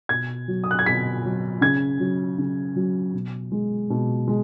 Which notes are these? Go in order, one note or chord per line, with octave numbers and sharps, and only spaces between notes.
B2 G#6
F#3
D#6
F#6
G#6
B2 B6
F#3
C#3 G#6
F#3
C#3
F#3
B2
G#3
B2
G#3